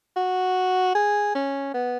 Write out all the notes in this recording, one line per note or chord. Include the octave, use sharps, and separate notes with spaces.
F#4
G#4
C#4
B3